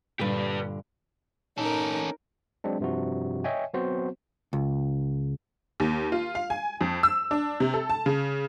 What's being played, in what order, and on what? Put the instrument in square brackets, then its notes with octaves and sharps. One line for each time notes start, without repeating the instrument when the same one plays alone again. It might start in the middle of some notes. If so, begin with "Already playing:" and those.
[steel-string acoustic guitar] G2 A#2 D3 [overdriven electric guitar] G4 B4
[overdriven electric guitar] C#4 A4 [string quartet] D#4 A#4
[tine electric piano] F#3 G#3 C4 D4
G2 C3 F3 F#4
C#5 D#5 E5 G5 G#5
F#3 B3 C4 F#4 C5
[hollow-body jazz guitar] C#2
[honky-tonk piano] D#2
F4
F5
G#5
F2
E6
D4
C3
A4
A5
C#3